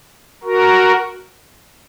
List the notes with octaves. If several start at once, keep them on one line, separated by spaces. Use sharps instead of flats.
F#4 A#4